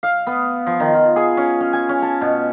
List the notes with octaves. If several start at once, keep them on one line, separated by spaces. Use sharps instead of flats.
F5
B3
F3
D#3
F4
G#4
C#4
C#4
G#5
C#4
A5
B2